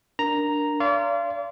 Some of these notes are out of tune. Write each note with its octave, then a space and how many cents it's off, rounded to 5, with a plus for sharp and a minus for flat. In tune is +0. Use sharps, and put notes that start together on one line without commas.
D4 +0 A#4 +0 A#5 +0
D5 -40 F5 -35 C6 +0